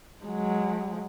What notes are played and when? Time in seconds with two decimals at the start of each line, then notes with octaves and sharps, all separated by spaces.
0.24 F#3 G#3